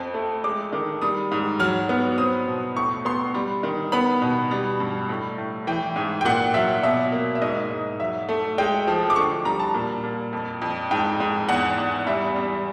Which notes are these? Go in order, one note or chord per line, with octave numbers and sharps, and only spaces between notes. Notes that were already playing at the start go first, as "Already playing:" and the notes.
Already playing: F2 C4
A3
G#3 D6
D#3
G3 D#6
G#2
F#3 F6
B3
C4 D#6
B2
A2 C#6
B3 C6
G3
D#3
B3 B5
B2
G3
G2
A2
A2
E3 G5
G#2
G5
A#2 F#5
F#3 E5
B2 E5
A#3
E5
G#2 D#5
G#2
F#3 E5
A3
G#3 G5
F3
D6
D3 C#6
G3 A#5
A5
A#2
A#2
F2
F2
G#2 G5
G#2
E2 F#5
E2
G3 E5
G3